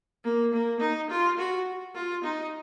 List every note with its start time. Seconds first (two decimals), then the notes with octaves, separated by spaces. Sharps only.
0.24 A#3
0.53 A#3
0.81 D#4
1.10 F4
1.39 F#4
1.95 F4
2.24 D#4